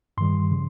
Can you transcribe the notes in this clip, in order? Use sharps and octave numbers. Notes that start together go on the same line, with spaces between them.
G2 D#3 G3 C6
C#3 F3